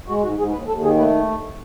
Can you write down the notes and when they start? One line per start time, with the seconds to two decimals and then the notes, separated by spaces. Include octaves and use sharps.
0.08 G#3 F#4
0.23 G#2 F#4
0.38 G#2 G#4
0.53 D#2 B4
0.68 D#2 A4
0.83 D#3 G#4
0.98 A3 B4